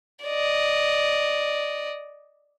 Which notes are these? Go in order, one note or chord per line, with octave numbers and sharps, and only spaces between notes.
D5 D#5